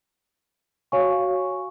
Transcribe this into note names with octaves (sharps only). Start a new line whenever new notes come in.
F#4 C#5 F5 G#5 C#6